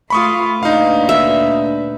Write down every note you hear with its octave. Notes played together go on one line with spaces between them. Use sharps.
A3 F4 B5 C#6 D#6
D2 A#2 D4 D#4 B4 F5
E5